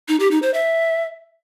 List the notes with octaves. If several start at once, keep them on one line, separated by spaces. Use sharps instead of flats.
D#4
G4
D#4
C5
E5